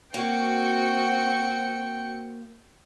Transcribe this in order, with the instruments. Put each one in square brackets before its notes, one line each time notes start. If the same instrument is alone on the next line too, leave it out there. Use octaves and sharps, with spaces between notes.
[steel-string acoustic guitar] A#3 [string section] C4 F#4 C#7 [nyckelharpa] G5